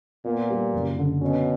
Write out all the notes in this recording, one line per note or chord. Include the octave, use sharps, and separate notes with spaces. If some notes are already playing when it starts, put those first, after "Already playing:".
A#2 B3
G3
F#1
D3
B2 C#4